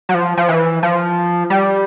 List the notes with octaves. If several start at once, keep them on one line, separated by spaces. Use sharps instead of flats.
F#3
F3
F3
E3
F3
G3